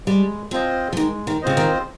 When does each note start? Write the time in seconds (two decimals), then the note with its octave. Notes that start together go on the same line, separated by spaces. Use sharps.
0.06 G3 G#3
0.51 F3 C4 F4 C5 D#5
0.93 F3
0.97 D#3 G#3
1.27 D#3
1.42 C#3 C4 F4 C5 D#5
1.57 D#3